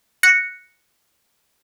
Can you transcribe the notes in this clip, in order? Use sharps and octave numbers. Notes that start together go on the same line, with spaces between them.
F#6 A#6 C#7